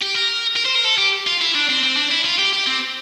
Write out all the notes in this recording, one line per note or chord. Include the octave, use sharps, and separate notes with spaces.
G4
A#4
A#4
C5
A#4
A4
G4
F4
E4
D4
C4
C4
D4
E4
F4
G4
G4
C4